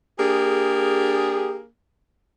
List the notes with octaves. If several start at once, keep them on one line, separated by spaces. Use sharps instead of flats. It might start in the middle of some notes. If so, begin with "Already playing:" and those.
A#3 D4 G4 G#4